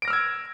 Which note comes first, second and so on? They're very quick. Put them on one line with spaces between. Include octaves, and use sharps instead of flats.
D7 A#6 F6 E6 G#6